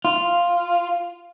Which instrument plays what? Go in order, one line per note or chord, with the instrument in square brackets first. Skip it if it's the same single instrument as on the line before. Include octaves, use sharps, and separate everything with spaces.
[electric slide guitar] F4